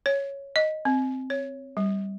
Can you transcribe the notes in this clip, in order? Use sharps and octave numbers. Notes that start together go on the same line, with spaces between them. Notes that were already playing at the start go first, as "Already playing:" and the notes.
C#5
D#5
C4
C#5
G3